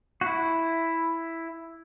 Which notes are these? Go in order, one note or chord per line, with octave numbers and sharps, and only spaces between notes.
F#4
E4